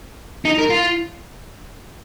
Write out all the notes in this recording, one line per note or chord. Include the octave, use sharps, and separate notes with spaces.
D#4
A#4
F4